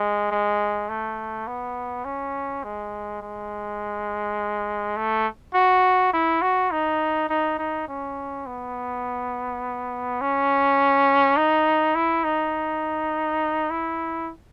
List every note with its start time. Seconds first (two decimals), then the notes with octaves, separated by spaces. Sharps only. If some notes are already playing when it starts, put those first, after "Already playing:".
Already playing: G#3
0.31 G#3
0.89 A3
1.47 B3
2.05 C#4
2.64 G#3
3.22 G#3
4.97 A3
5.54 F#4
6.13 E4
6.42 F#4
6.71 D#4
7.29 D#4
7.59 D#4
7.88 C#4
8.46 B3
10.21 C#4
11.37 D#4
11.95 E4
12.24 D#4
13.70 E4